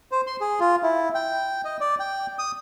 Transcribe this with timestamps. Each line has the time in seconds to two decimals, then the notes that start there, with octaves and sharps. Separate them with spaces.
0.12 C5
0.27 C6
0.41 G#4
0.60 F4
0.83 E4
1.15 G5
1.65 D#5
1.80 D5
2.00 G5
2.39 D#6